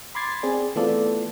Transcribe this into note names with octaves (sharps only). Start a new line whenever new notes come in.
B5 C6 D6 G#6 A6 C7
C4 G#4 D5
E3 A3 B3 F4 A4 D5